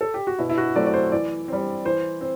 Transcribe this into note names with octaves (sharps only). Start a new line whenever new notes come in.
A4
G4
F#4
B2 E4
E4
F#4
F#3 A3 C4 D5
D5
C5
E3 D5
G3 C4
E3 C5
C4